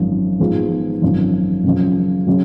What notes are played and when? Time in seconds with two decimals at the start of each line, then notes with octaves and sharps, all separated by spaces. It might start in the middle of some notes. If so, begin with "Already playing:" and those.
Already playing: G#1 F#2 F3
0.39 G#2 F3 B3 F4 G#4
1.02 G#1 F#2 F3
1.64 F#2 C#3 F3
2.27 C#3 F#3